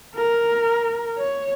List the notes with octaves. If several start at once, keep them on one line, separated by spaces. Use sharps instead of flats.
A#4
C#5